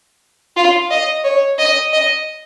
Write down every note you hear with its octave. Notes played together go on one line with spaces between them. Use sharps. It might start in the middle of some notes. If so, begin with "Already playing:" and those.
F4
D#5
C#5
D#5
D#5